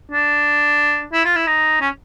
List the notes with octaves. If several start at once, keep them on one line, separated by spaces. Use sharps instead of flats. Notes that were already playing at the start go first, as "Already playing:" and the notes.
D4
E4
F4
E4
D#4
C#4